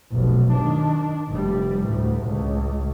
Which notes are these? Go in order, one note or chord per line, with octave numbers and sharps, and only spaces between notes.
F1 B1
D#3 D4
F1 G3
D2 A2
C#2